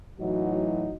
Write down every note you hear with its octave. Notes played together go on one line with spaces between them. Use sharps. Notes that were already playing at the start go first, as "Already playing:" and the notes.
A2 E3 F#3 D#4 F#4